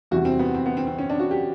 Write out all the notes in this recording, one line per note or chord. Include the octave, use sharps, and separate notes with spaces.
E2 C3 E3 G3 F#4
C4
B3
C4
B3
C4
C4
C#4
D4
F#4
G4